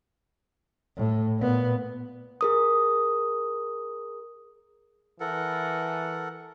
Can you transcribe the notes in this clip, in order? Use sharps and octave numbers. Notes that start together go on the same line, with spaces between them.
A2
A#2 B3
G#4 A#4 D#6
E3 A4 A#4 F#5